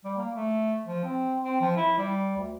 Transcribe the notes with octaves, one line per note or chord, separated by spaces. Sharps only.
G3
A#3
A3
F3
C4
C4
F3
E4
G3
D2